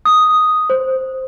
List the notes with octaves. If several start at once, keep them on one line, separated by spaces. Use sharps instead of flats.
D#6
C5